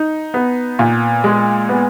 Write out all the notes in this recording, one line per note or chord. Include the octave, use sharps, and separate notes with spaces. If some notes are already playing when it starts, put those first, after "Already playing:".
Already playing: D#4
B3
A#2
G#3
B3